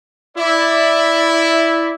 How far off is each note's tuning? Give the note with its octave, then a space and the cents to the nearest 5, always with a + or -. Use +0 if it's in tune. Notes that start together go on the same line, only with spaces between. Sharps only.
E4 +0 D5 +0